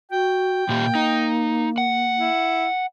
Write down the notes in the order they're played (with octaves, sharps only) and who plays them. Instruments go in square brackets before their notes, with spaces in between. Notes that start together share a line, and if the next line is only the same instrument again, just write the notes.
[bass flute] F#4 [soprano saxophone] G5
[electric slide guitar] A#2 G4 [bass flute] A#3
[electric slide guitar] D#4
F#5
[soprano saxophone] E4